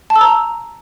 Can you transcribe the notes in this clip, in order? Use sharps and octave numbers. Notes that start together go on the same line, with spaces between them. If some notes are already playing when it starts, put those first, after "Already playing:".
A5
E6
A#5